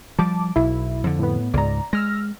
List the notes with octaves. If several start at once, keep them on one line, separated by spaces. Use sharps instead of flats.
F3 G3 A5 D6
B1 E4
F2 D3
A2 B3
C#2 G#2 D5 A#5
G#3 E6 F6 A#6